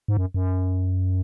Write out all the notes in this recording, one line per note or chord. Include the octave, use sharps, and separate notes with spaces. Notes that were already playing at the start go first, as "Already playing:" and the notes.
G#2
F#2
F#2